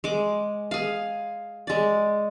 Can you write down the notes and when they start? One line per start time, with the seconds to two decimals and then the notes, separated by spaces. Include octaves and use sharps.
0.04 G#3 D6
0.71 G#4 F5
1.67 G#3 D5